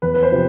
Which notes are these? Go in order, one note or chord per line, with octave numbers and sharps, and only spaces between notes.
E2 B4
B4
C5
C3 F3